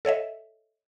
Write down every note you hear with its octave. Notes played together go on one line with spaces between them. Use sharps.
A4 C#5 D#5 E5